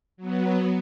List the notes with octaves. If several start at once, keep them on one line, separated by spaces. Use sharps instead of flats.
F#3 B3